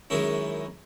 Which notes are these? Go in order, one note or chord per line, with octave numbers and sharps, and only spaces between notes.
F#2 D#3 G#3 C#4 E4